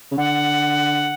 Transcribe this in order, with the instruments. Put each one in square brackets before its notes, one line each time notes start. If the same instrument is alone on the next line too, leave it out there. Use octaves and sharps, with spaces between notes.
[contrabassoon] C#3
[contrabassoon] D3 [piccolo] F#5